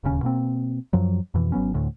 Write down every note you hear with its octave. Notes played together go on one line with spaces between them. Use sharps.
D1 D#2 C#3 C#4
B2 A#3 C4
F#2 F3 F#3
F2 B2 E3
G#1 F#3 B3 C#4
D2 A2 D3